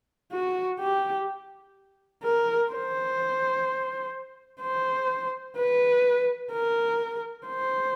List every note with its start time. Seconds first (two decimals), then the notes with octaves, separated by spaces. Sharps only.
0.33 F#4
0.80 G4
2.24 A#4
2.72 C5
4.62 C5
5.57 B4
6.52 A#4
7.47 C5